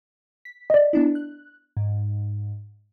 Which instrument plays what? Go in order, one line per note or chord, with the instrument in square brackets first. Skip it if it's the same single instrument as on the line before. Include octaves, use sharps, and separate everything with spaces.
[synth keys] B6
[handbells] D5 D#5
[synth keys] B3 D4 E4
F#6
G#2